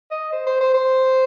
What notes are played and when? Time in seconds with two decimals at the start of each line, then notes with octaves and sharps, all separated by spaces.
0.11 D#5
0.32 C5
0.46 C5
0.61 C5
0.74 C5